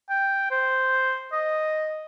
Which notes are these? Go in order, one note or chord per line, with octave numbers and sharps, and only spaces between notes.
G5
C5
D#5